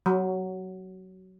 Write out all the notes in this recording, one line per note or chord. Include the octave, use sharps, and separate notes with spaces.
F#3